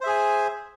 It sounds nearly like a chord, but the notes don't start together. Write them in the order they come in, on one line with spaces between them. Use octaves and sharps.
C5 E5 G#4 G#5